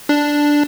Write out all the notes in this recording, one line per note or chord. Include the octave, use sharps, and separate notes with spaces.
D4